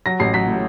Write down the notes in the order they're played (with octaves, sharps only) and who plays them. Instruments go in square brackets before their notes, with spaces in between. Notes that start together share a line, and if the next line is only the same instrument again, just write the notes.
[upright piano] F#3 A#6
A1 C7
F#3 B6
A2